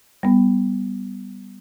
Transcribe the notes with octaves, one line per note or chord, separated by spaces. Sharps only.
G3 B3